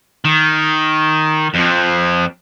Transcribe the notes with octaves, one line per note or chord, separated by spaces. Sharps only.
D#3
F2 F3